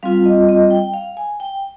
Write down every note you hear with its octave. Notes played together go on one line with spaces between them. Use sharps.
G3 C4 F4 F5
D#5
D#5
G5
F5
G#5
G5